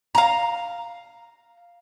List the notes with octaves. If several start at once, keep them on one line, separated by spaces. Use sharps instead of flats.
F5 A#5